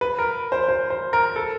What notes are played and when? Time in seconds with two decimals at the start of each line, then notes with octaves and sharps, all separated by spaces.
0.01 B4
0.18 A#4
0.52 C5
0.68 C5
0.90 C5
1.13 A#4
1.36 A4